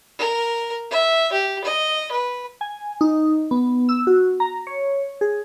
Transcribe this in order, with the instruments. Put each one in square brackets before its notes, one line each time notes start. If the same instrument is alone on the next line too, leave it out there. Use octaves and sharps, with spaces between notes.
[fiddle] A#4
E5
G4
D#5
B4
[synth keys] G#5
D#4
B3
E6
F#4
A#5
C#5
G#4